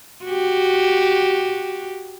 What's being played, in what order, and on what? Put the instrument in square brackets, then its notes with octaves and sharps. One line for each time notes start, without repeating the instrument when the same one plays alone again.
[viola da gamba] F#4 G4